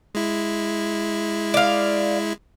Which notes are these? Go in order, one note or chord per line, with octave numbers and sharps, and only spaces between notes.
G#3 E4
D5 F5